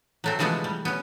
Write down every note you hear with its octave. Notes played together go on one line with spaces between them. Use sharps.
F#3 A3 C4
C3 E3 F3 G#3 A3 B3
G3
B3 C#4